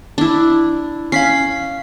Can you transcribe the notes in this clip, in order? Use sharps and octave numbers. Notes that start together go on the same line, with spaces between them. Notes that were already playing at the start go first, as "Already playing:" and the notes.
D4 E4
C#4 F5 B6 C7